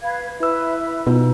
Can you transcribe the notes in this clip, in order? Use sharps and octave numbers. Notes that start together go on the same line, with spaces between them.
B4 F5 G#6
E4 B4 E5 E6
B2 D#4 F4 B4